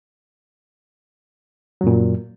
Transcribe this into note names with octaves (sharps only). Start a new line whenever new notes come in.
F#2 A#2 F#3